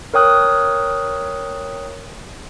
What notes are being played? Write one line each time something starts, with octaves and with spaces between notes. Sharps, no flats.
A#4 C#5 G5 D#6 F#6